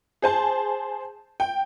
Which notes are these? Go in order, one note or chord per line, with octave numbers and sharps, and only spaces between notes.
G#4 C5 A5
G5